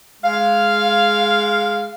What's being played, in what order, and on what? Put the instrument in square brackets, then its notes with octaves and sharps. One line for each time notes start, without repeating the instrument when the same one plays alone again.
[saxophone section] G#3 F5